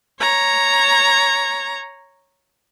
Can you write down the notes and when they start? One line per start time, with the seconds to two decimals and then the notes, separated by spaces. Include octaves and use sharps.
0.20 C#5 A#5